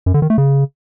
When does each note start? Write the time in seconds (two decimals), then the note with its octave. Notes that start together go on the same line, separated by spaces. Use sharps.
0.06 F#2
0.14 D3
0.22 D#3
0.30 A3
0.38 C#3